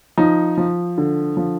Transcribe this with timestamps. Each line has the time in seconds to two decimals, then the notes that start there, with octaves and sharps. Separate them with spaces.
0.18 F3 D#4
0.58 F3
0.98 D3
1.37 F3